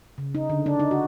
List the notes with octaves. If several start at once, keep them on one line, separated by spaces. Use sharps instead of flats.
C#3
D#4
D3
D4
D#4
F#4